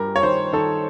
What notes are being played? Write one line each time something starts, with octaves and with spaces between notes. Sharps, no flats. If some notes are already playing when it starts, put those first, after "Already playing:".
Already playing: G2 G3 A#4
C#5
D#3 C5
D#3 A4